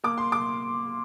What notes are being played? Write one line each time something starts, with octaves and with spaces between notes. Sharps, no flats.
A#3 D6
C6
D6